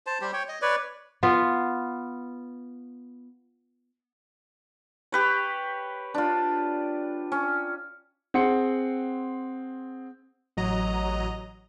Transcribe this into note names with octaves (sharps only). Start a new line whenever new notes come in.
C5 A5
G3 G4 C5
C#5 G5
D#5
B4 C#5 D5
B3 F4 B4
G4 B4 C#5
D4 F4
C#4
C4 G#4 F#5 C6 C#7
A1 F#3 D#5 A#5